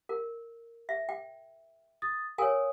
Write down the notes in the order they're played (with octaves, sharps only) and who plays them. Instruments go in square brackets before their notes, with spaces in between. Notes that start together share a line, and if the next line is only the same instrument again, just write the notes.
[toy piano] A#4
E5
G5
[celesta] D#6 A6
[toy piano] A#4 G#5 [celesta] C#5 F5 D#6